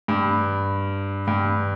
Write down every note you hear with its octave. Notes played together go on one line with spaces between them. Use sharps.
G2
G2